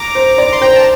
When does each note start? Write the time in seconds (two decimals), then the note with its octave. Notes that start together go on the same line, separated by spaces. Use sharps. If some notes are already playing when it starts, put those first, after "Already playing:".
Already playing: A#5 D6
0.15 C5
0.38 D5
0.53 C6
0.61 C5 G5 A#5
0.76 A5